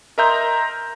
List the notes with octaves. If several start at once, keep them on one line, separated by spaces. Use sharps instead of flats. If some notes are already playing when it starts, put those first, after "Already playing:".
A#4 D#5 E5 A#5 C6 G6